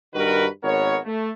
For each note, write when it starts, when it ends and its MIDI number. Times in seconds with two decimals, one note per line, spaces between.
0.14 0.46 43
0.14 0.46 51
0.14 0.46 66
0.14 0.46 70
0.14 0.46 71
0.64 0.98 32
0.64 0.98 59
0.64 0.98 70
0.64 0.98 73
1.05 1.30 57